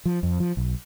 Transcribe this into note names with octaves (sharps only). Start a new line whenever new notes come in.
F3
F2
F3
B1